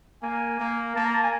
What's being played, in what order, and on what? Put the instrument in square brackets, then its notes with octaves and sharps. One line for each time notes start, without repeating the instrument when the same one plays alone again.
[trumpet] A#3 [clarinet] G#5
[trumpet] A#3
[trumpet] A#3 [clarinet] A5
[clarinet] A#5
A5
G#5